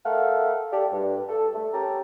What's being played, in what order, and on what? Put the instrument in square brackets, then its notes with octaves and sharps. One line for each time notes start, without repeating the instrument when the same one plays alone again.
[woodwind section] A3 A4 A#4 F5 F#5
G4 A4 D5
G2
A4
A3
C#4 G4 A5 A#5